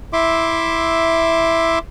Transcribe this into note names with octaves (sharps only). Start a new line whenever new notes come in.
E4 E5 C6 D6